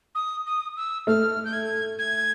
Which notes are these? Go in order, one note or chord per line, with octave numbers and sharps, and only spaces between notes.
D#6
D#6
E6
A3 F6
G6
G#6
G#6